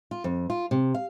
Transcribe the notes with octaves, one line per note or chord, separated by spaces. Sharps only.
F4
F2
F4
C3
F5